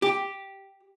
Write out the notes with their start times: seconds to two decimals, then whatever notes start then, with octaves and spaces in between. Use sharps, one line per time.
0.02 G4